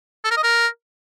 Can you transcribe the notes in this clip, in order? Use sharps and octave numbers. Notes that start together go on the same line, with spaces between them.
A4
A#4
D#5
A#4